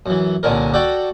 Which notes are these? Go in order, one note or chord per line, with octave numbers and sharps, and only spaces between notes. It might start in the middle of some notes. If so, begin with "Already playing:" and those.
F#2 E3
C2 A#2 D3 C#4 A#4
F#4 A4 D5 F#5 G5